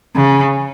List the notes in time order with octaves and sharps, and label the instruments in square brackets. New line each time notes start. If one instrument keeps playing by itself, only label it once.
[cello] C#3